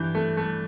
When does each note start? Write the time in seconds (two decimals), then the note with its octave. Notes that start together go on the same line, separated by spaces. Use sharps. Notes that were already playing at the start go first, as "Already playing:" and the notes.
Already playing: G2 E3 G6
0.15 A3
0.37 A3